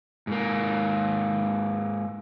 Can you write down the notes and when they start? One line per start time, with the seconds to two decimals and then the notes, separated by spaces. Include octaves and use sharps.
0.27 G#2 A#3